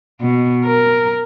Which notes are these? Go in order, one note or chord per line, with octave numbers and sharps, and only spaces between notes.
B2
A#4